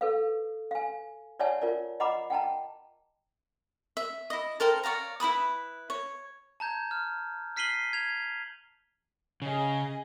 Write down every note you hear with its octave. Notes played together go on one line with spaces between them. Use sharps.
A4 B4 F5
F5 G#5
C#5 D5 E5 F#5 G#5 A5
F4 A#4 D5
D#5 F#5 A#5 B5 D6
F#5 G5 A5 A#5
E5
E4 D#5
A4 A#4 C5 G5
C#5 D5 F5 A#5
E4 B4 B5 D#6
C#5
A5 A#5 G6 G#6
F6
F6 B6 C7 D#7 F#7 G7
G#6 F7
C#3 G#4 D#5